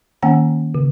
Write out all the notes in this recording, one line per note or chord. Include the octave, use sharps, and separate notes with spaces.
D#3 A#3 C#4 F#5 G5 A#5
C#3